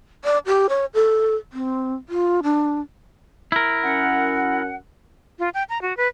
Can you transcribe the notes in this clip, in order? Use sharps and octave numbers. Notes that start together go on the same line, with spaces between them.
D5
G4
C#5
A4
C4
F4
D4
E4 A#4
F#2 C#4 F#5
F4
G5
A#5
F#4
B4